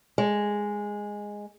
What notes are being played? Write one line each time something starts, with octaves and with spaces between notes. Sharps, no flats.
G#3